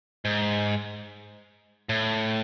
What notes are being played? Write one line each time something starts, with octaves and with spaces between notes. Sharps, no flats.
G#2
A2